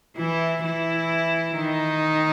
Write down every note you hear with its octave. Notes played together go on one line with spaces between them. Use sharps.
E3 E4
E3 E4
D#3 D#4